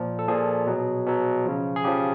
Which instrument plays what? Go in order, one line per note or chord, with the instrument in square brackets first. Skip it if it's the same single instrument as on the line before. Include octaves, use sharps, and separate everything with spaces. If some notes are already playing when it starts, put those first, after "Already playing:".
Already playing: [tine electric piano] A#2 F3
A4
A#2 F3 G#4
B2 F#3
B2 F#3
C#3 F3
G#4
C#3 F3 G4